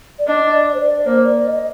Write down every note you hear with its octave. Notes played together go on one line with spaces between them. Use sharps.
D5
D4 D#5
D5
C5
D5
A#3 C5
D5
D#5